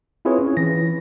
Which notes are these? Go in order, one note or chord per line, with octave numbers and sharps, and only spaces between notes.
C4 E4 F4 G#4 B4 C#5
C#4
E3 A#6